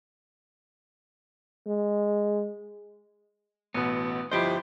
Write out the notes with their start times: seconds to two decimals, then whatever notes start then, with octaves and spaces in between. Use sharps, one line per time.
1.66 G#3
3.74 A1 B2 B3
4.31 G1 F3 E4 G4 C5 D#5